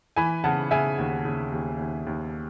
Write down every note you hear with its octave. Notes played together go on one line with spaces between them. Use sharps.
E3 G#5 B5
C#3 F#5 A5
C#3 E5 G#5
D#2
C#3
D#2
D#2
D#2